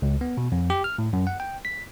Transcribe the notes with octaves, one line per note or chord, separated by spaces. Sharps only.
C#2
B3
B2
F2
G4
F6
A2
F#2
F#5
G5
B6